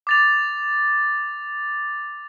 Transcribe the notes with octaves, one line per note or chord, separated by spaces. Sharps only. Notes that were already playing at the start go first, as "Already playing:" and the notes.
D6 A6 F7